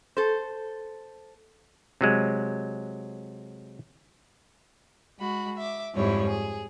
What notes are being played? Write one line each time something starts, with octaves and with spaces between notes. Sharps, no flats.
A4 C5
C3 F#3 G#3
G#3 F#4 B5
E5 D6
F2 G#2 F3 G3 E4 C#5
G#4